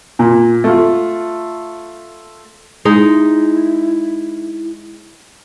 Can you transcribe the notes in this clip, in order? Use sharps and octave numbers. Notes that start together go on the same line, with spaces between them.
A#2
A3 F4
G#3 D#4 E4